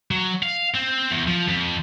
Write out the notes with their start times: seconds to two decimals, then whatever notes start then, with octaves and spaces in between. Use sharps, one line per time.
0.11 F#3
0.43 F5
0.75 C4
1.11 E2
1.28 F3
1.48 F2